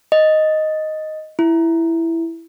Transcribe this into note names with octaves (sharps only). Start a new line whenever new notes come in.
D#5
E4